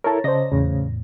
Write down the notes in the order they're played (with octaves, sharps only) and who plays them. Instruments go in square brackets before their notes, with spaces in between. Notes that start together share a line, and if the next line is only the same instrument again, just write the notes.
[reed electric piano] E4 A4 A#4 [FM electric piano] C#5 A5 A#5
[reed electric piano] C#3 D#5 [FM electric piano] C5 D5 A#6
[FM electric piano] E2 A2 [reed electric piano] C#3